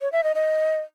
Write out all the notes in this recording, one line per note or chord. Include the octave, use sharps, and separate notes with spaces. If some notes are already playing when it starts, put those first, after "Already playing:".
C#5
E5
D#5
D#5